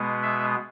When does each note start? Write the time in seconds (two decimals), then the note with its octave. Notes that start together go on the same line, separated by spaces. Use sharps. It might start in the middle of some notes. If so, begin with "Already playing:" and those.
Already playing: B2 G#3 B3
0.22 E5